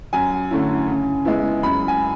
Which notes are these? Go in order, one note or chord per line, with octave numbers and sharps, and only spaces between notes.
F#2 G#5
D3 A3 C#4 E4
C#3
G#3 B3 E4
F#2 B5
G#5